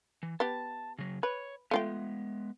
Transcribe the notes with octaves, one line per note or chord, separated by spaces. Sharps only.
E3
B3 G4 A5
C#3 F#3
B4 C#5
G#3 A3 B3 F4 G5